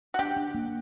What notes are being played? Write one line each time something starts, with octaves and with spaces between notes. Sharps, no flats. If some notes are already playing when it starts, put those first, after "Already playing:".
F#4
D4 G4
D4
A#3